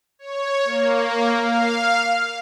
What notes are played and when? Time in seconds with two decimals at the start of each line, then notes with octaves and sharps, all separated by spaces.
0.19 C#5
0.64 A#3
1.34 F5